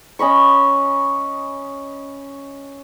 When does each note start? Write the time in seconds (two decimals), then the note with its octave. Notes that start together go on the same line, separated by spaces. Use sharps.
0.19 C#4 D#5 B5 C#6